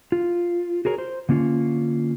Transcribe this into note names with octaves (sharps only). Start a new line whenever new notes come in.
F4
F#4 G#4 A#4 C#5
C5
D3 A#3 C#4 F4